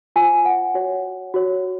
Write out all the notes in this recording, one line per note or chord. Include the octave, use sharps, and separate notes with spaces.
F4 C5 G#5
F#5
F#4 C#5
F#4 C#5